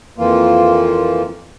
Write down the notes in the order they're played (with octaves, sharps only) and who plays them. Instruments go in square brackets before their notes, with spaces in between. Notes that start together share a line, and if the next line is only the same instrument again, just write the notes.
[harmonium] F2 E3 A#3 F4